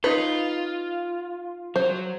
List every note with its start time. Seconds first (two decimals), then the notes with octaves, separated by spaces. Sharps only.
0.04 D#4 F4 B4
1.76 F#3 C5